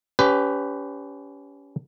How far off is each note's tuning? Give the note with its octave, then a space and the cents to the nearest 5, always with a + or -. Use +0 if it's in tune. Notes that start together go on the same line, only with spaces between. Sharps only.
C#4 +25 G4 +0 B4 +20